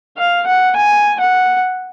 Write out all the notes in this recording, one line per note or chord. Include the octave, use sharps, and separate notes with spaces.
F5
F#5
G#5
F#5